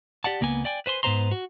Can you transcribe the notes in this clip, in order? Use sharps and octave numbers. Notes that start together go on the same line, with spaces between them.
G4 D5 F#5 A5
C#2 A#3 B3 G#5
D5 G5 G#5
B4 C5 G#5 C6
G#2 B3 B4 C5 A#5 C6
F#4